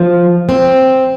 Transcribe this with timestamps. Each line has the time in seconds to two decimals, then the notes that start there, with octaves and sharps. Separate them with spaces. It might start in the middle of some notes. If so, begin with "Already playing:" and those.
Already playing: F3
0.49 C4